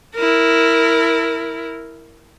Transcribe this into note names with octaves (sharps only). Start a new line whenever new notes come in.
E4 A#4